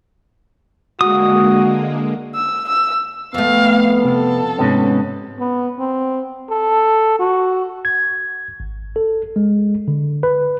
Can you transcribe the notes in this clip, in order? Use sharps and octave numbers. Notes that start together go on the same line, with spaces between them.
D3 G#3 A#3 F#4 D#6
E6
E6
F2 A3 B3 F5
C3 A4
G#2 C3 B3 C#4
B3
C4
A4
F#4
G#6
G#1
A4
G#3
D3
B4